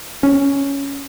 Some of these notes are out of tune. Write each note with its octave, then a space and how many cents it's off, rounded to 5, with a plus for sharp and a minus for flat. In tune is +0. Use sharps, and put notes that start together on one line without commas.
C#4 +5